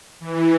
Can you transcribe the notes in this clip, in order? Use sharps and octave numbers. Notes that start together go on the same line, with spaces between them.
E3